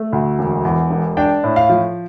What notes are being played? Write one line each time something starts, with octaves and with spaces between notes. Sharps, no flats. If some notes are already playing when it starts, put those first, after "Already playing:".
Already playing: A3
D2
E1
E2
E1
D4 G5
A2
F5
F3